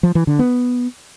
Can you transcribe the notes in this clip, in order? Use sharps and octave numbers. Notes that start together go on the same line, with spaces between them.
F3
E3
D3
B3